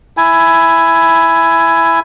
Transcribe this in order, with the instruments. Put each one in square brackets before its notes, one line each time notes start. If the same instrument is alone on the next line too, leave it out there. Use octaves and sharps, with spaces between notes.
[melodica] E4 G#5